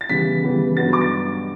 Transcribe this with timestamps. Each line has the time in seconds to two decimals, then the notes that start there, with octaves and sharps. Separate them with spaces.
0.01 A6
0.09 C#3 E3 G3 B3 B6
0.43 C#3 E3 G3 B3
0.76 G2 F#3 B3 A6
0.93 D6
1.01 A6